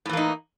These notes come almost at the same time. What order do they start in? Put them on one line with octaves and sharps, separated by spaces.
A2 E3 A#3 D#4